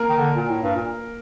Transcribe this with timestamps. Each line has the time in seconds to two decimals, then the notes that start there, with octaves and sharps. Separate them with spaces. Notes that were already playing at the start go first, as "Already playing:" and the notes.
Already playing: A#3 A#4
0.09 D#3
0.18 D3
0.36 A#2
0.49 A2
0.62 G2
0.76 A#2